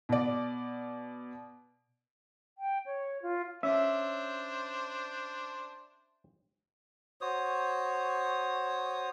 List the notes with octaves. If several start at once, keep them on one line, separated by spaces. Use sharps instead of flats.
B2 D5
G5
C#5
F4
C#4 D4 C5 E5
F#4 C5 C#5 D#6